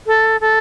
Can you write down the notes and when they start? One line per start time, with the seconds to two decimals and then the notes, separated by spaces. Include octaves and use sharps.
0.07 A4
0.41 A4